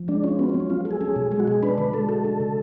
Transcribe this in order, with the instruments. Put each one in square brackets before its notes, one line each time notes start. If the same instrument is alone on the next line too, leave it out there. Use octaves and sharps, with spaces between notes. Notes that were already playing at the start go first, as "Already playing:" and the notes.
Already playing: [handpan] F3
[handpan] G#3 [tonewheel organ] D4
[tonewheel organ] C#4 [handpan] F4
[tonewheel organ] B3 [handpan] F#4
[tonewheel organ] C#4
[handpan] F#3
[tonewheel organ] C#4
[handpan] B3 [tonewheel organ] F4
[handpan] A4
[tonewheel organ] G#4
[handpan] C#4 [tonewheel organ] G#4
[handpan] B2
[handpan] G#3 [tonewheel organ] G#4
[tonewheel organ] F#4
[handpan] B2 [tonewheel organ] G#4
[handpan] D4 [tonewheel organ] B4
[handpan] D3 [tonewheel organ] B4
[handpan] G#3 [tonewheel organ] A4
[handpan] F#4 [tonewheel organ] A4
[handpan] D4
C#3